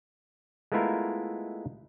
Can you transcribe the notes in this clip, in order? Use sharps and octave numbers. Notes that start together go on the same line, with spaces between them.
G#3 A3 B3 E4 F4 A#4